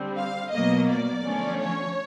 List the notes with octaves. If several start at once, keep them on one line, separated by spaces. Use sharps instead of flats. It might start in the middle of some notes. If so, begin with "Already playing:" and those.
Already playing: D3 G3 C4
F5
B2 F#3 A#3 D#5
D5
D3 F3 A3 C#4
C#5